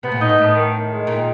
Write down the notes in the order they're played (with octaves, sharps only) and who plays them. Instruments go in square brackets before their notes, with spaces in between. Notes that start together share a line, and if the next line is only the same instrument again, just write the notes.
[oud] C3 [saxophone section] B3
[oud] A#2
[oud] A2 [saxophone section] D#4
[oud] G#2
[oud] A2 [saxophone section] B3
[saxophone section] D#3
D#3
G#3
[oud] A#2 [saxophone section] D#3